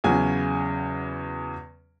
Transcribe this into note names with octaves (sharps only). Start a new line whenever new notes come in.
E2 C#3 F#3 G#5